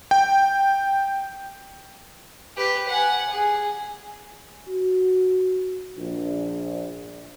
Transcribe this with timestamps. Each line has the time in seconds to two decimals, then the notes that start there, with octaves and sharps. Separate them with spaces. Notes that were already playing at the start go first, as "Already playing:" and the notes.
0.11 G5
2.57 G4 B4
2.88 F#5 G#5
3.30 G#4
4.68 F#4
5.97 A#1